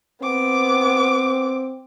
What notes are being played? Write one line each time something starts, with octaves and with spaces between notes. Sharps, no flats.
B3 C4 D6